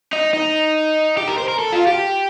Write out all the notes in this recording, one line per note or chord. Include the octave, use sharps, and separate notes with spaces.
D#4
D#4
G4
A#4
C5
A#4
A4
F4
G4